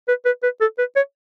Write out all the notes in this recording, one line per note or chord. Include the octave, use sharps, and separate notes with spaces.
B4
B4
B4
A4
B4
C#5